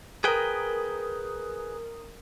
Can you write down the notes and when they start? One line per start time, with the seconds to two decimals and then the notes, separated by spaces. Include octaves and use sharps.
0.24 G#4 A#4 B4 G5 D#6